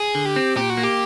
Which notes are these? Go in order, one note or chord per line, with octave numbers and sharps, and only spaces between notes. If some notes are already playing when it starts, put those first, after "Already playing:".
Already playing: G#4
D3
G4
C4
A#2 G4
F#4
A#3
G4